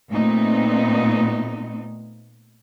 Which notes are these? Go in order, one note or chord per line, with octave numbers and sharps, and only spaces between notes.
A#2 A3 B3 C4 D#4